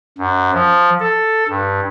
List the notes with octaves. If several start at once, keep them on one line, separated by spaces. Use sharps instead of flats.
F#2
F3
A4
G2